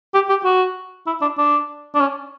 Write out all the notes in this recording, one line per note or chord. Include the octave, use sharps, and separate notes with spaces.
G4
G4
F#4
E4
D4
D4
D4
C#4